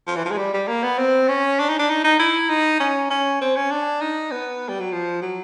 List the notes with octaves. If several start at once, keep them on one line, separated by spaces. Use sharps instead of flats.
F3
E3
F3
G#3
G3
G3
A#3
B3
C4
C#4
D4
D#4
D4
D#4
D#4
E4
D#4
C#4
C#4
C4
C#4
D4
D#4
B3
G3
F#3
F3
F#3